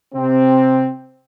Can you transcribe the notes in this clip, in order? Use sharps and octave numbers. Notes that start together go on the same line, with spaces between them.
C3 C4